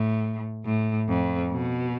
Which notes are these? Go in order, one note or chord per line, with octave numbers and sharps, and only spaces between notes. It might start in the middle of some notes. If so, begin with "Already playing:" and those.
Already playing: A2
A2
F2
B2